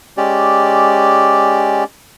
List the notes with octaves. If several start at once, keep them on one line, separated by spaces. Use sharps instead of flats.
G#3 C#4 G4 D5